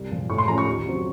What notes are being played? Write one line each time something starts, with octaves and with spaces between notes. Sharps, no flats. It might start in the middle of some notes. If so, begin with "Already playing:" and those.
Already playing: C2
A#2 F3
A2 C#6
C6
F3 A3 C#4 A#5
C#6
D#2
C#3 F#3 C4